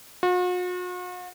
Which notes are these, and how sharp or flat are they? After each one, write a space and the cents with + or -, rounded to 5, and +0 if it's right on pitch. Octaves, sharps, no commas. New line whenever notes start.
F#4 -45